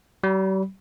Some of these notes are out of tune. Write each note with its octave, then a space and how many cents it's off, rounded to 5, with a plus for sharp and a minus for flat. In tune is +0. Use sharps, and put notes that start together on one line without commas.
G3 -45 B5 -15